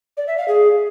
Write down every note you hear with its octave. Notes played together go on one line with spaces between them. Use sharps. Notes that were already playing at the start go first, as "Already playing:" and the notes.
D5
E5
F5
G#4